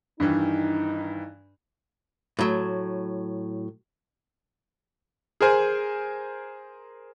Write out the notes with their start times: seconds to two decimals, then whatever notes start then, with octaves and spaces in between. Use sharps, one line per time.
0.20 G2 D#3 E3 D4 D#4
2.39 A2 F#3
5.41 G#4 A#4 C5 G#5